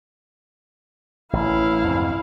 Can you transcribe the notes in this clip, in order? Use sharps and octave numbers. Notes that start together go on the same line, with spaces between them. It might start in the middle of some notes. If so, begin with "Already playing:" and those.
A1 E4 F5
F2 G#2 C3